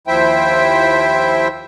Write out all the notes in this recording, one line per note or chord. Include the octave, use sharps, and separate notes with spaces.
D#2 F3 E4 C5 E5 G5